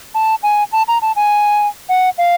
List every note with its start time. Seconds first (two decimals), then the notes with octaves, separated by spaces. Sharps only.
0.15 A5
0.43 G#5
0.72 A5
0.88 A#5
1.02 A5
1.16 G#5
1.89 F#5
2.18 F5